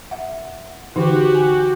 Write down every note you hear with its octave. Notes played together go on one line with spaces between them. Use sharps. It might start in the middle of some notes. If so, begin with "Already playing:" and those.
E5 F#5
D3 E3 D#4 F#4 G4
G#5